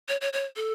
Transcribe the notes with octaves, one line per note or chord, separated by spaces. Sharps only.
C#5
C#5
C#5
A4